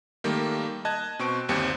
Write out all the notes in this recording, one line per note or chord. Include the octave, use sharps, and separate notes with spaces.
D#3 G3 A3 A#3
D#5 A5 F#6 G#6
B2 C4 C#6 D7
G1 D#2 G3 C4 C#7